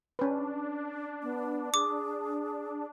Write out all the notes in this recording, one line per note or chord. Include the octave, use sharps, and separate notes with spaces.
C#4 D4 B4
B3
G#4 D6